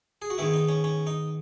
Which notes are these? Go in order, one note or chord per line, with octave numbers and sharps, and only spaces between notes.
G#4
F#4
G#2 D#3 G#3 B3 E4
D#4
C#4
C#4
D#4